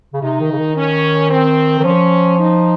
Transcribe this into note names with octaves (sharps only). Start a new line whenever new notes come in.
C#3
C3 D#4
D#3
C#3
D#3
C#4
C4
D#3
F3 C#4
D#4